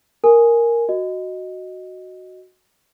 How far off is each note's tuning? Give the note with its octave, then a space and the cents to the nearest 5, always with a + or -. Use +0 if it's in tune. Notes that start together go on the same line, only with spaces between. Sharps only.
A#4 +0 G#5 +0
F#4 +0 D#5 +0